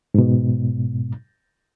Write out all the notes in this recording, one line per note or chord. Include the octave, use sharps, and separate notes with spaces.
G#2 B2